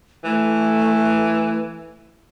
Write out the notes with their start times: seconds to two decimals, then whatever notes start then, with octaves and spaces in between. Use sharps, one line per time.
0.24 E3 A3